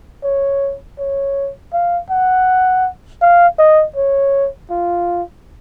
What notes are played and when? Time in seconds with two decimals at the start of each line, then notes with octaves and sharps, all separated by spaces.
0.24 C#5
0.98 C#5
1.73 F5
2.10 F#5
3.22 F5
3.58 D#5
3.96 C#5
4.70 F4